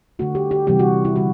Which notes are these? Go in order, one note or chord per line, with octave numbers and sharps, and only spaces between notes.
D3 A3 F#4
G4
G4
C3 E3 G3 G4
F#4
E4
D3 G3 F#4